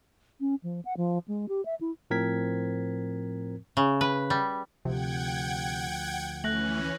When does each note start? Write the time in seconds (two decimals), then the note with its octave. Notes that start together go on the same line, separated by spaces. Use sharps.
0.40 C#4
0.63 F3
0.85 F#5
0.97 F3
1.28 G#3
1.49 G4
1.65 E5
1.81 E4
2.10 A2 F3 C4 A#4 G#6 B6
3.77 C#3
4.01 B4
4.30 G3
4.85 D2 C3 F3 F#5 G5 G#6
6.44 E3 A3 C#4 F#6 A#6 F#7